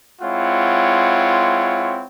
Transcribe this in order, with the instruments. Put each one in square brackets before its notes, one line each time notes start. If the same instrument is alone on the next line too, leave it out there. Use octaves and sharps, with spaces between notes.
[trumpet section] G#3 C4 E4 F4 C#5 F#5